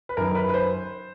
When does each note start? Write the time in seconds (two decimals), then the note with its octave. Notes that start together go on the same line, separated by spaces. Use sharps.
0.09 B4
0.17 F#2 D#3 A#4
0.35 B4
0.49 B4
0.54 C5